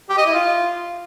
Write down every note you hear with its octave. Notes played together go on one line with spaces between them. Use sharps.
G4
D#5
E4
F4